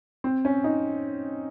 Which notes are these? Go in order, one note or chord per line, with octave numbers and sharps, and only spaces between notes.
C4
C#4
D#4